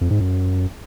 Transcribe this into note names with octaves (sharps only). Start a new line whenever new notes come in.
F2
G#2
F#2